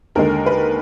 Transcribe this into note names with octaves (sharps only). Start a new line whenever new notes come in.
D#2 D3 G#3 A#4
B4